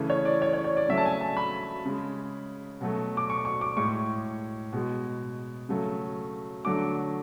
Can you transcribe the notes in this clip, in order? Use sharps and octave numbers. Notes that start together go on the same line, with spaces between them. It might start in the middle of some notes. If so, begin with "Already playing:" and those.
Already playing: C#3 E3 A3
C#5
D5
C#5
C#5
C#5
D5
C#3 F#3 A3 E5
A5
G#5
A5
B5
C#3 G#3
B2 F#3 A3
D6
C#6
C#6
D6
A2 G#3 C#6
B2 G#3
C#3 F#3 A3
D3 F#3 A3 D6